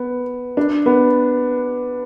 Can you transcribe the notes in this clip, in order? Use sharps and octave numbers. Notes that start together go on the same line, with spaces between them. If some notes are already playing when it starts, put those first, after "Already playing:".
Already playing: B3
D4
B3